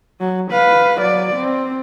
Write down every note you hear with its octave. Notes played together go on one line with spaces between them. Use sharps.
F#3
B4 F5
F#3 D5
C4